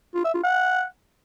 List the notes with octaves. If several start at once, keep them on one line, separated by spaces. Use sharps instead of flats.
F4
E5
F4
F#5